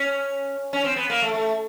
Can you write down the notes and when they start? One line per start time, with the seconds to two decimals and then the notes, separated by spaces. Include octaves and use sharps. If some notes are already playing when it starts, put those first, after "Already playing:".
Already playing: C#4
0.73 C#4
0.84 C4
0.96 B3
1.10 A#3
1.22 A3
1.34 A3